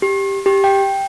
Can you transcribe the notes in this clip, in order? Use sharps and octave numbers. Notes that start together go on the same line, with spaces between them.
G4
G4
G5